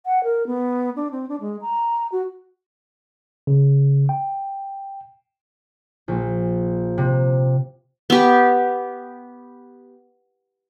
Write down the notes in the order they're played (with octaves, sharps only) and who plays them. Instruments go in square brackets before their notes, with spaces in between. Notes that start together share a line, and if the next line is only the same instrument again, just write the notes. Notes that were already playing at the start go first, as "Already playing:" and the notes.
[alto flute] F#5
A#4
B3
D4
C4
D4
G#3
A#5
F#4
[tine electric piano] C#3
G5
[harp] A#1
C3
[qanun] B3 G4